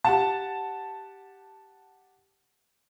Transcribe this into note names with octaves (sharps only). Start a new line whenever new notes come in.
G4 F#5 A5